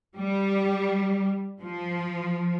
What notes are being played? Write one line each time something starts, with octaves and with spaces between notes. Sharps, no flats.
G3
F3